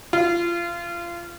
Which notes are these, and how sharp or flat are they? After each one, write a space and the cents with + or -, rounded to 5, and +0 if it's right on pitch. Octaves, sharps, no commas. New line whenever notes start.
F4 -25